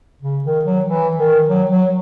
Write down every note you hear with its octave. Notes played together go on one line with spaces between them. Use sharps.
C#3
D#3
F#3
E3
D#3
F#3
F#3